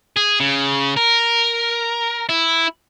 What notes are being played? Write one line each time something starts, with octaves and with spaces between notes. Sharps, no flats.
G#4
C#3
A#4
E4